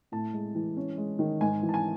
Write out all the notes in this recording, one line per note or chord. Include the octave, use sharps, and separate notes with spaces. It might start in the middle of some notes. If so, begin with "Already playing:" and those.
A2 A5
G#3
E3
C#4
G#3
D#3
G#2 G#5
E3
A5
G#5